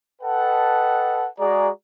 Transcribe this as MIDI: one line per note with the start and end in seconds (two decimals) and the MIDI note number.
0.22 1.27 69
0.22 1.27 71
0.22 1.27 75
0.22 1.27 78
0.22 1.27 79
0.22 1.27 81
1.38 1.70 56
1.38 1.70 66
1.38 1.70 68
1.38 1.70 74
1.38 1.70 82